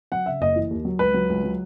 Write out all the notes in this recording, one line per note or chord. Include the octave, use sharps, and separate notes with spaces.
F#3 F#5
C#3 E5
F#1 D#5
E3
D#2
F#3
C#2 B4
F#3
C#2
F#3